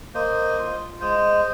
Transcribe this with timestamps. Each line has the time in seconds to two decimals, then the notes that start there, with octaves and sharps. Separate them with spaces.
0.14 A#3 C5 D#5
0.58 F4
1.01 G#3 C5 D#5